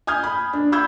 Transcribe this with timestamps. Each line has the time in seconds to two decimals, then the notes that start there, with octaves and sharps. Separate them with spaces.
0.07 G#5 D#6 F6 G6 G#6
0.23 B5
0.53 D4
0.72 B5 E6 G6 G#6